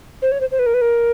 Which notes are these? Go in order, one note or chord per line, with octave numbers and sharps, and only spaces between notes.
C5
C#5
C5
C5
B4
A#4
B4
A#4